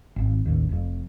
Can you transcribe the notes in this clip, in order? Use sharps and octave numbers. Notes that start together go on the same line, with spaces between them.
G#1
A1 D#2
F1 F2